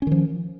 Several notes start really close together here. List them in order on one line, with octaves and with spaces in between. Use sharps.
C#4 D#3 F3